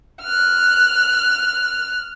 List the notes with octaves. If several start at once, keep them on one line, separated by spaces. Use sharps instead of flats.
F6 F#6